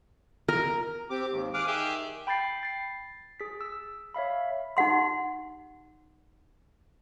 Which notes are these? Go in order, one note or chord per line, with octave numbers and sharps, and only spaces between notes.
A#4
C4 G4 D6
D#2 G#2 D#3
D#3 G#4 F5 D6 F#6
D#3 G4 G#4 E5
G5 B5 G6 A6 C7
A6 C7
G#4 B6
E6
C#5 E5 F5 B5
D#4 G4 F#5 C6